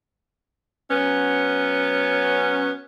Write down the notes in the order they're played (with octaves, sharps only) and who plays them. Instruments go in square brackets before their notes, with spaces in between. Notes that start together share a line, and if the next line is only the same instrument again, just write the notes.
[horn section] F#3 B3 C#4